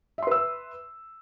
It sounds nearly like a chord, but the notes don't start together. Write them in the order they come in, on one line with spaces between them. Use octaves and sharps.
E5 C6 B4 E6